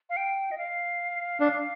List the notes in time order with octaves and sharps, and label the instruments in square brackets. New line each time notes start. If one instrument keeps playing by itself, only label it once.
[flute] F5
G5
D#5
F5
[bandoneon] D4